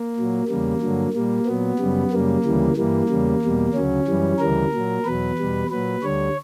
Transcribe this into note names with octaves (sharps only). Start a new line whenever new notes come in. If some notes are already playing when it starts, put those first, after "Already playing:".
Already playing: A#3
A#2 F#3
E2 C#3 G3 A#3
G2 D3 F#3
A#2 G3 A#3
A#2 F#3 B3
F#2 C#3 G3
F#2 C#3 G3 A#3
D2 C#3 E3 G3
G2 E3 G3 A#3
E2 C#3 G3
E2 B2 G3
D2 C#3 F#3 C#4
F#2 E3 G3
D2 C#3 E3 G3 A#4
A#2 F#3
E2 B2 F#3 B4
E2 B2 G3
A#2 F#3 B4
D2 D3 G3 C#5